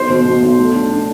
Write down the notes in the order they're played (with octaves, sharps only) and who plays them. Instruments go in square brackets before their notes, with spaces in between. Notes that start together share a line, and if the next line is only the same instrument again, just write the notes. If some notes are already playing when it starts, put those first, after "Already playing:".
Already playing: [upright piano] B1 C5
B2
B2
B1
A3
D4
D4